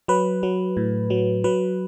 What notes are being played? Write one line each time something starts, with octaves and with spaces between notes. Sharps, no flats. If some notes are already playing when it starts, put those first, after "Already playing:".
F#3 B4
F#3
A2
F#3
F#3 B4